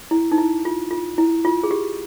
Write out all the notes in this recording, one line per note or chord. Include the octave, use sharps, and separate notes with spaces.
E4
D#4
E4
F4
F4
E4
F4
G#4
G4